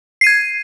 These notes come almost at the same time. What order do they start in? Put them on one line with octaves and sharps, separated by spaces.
C7 D#7 G#6